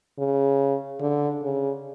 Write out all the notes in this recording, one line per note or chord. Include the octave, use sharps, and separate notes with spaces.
C#3
D3
C#3